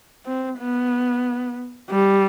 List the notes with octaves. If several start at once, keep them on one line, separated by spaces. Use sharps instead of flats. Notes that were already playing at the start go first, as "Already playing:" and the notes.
C4
B3
G3